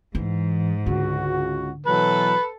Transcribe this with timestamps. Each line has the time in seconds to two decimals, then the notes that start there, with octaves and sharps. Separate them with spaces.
0.15 G#2 E3
0.86 C#2 D3 F#4
1.86 B2 E3 F#3 A4 B4